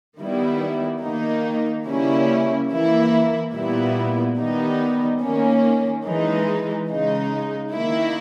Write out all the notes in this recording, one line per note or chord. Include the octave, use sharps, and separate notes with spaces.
D#3 G3 B3 E4
D#3 A#3 D#4
C#3 G3 A#3 C#4 E4
E3 A#3 E4
A#2 G3 B3 E4
D#3 G3 B3 D#4
D#3 A#3 C#4
E3 G#3 D#4
C#3 G#3 D#4
D#3 A#3 E4